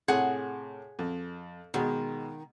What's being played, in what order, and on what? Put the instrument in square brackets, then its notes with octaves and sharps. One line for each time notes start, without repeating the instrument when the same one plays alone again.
[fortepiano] A2 C3 [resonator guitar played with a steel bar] G#4 F#5
[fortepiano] F2
[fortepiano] B2 G#3 [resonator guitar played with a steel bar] D#3